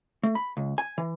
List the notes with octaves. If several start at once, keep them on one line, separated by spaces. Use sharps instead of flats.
A3
B5
C#2
G#5
E3